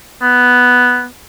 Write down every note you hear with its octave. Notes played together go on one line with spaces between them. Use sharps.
B3